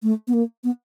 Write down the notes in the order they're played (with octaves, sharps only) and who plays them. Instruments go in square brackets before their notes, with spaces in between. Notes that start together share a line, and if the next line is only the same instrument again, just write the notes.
[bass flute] A3
B3
A#3
B3